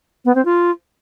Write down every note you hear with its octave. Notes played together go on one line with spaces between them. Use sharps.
B3
C4
F4